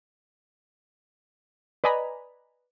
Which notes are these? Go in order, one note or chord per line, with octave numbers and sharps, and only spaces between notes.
B4 D5 D#5 G#5 A#5 B5